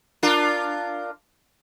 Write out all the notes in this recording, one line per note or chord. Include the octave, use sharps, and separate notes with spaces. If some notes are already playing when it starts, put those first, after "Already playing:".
D4 F4 A#4